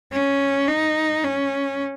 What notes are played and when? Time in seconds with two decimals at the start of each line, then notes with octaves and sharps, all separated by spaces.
0.13 C#4
0.68 D#4
1.24 C#4